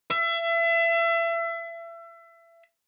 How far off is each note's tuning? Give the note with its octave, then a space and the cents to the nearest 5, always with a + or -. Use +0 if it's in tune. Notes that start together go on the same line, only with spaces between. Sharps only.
E5 +30